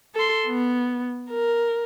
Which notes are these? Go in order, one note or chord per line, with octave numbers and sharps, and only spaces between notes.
A4 C6
B3
A#4